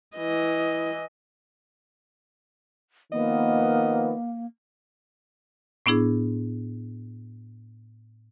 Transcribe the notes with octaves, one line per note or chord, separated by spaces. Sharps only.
E3 D#5
D#3 F3 A#3 B3 D#5
A2 B3 D4 E4 G#4